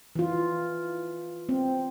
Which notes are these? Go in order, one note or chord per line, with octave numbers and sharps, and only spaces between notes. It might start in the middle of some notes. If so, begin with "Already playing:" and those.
E3 F4
C4